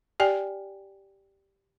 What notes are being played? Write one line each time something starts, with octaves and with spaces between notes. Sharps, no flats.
G4 D5 G5 G#5